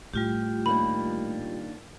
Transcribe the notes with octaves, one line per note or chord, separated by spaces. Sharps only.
A2 G3 F4 G4
D#3 A#3 D4 B5